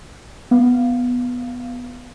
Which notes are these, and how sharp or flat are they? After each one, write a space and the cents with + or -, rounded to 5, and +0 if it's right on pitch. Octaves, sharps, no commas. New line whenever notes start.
B3 +0 F5 -10